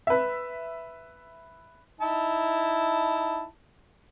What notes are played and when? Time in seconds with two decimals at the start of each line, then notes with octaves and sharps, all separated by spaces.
0.07 B4 E5
2.01 D#4 E4 A5